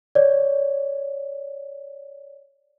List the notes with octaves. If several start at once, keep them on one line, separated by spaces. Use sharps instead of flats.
C#5 D5